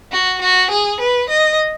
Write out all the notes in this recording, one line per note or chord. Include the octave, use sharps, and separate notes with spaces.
F#4
F#4
G#4
B4
D#5